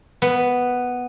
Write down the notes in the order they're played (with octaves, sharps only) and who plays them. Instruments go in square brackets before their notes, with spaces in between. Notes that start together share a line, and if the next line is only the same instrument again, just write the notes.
[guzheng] B3